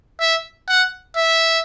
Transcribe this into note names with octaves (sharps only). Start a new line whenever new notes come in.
E5
F#5
E5